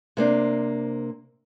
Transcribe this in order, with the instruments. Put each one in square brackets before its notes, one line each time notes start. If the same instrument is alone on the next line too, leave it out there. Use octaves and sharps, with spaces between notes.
[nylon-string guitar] C3 A#3 D4 C5